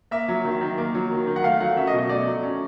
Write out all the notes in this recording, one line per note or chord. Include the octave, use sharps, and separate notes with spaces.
A#3 E5
F#3
D#3
D#3
A#3
F#3
D#3
D#3
F#5
A3 F5
F#3 F#5
C#4 E5
D#5
B2
D#5
A3 D5
F#3
C#4